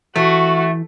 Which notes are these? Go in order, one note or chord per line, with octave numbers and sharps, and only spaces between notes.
E3 A3 F#4